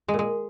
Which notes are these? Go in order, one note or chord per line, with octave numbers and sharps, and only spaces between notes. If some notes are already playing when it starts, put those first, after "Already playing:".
G#3
A#2
G#3